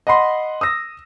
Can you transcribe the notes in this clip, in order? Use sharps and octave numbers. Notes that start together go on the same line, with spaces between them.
D#5 F#5 B5 C6
D#6 E6 A#6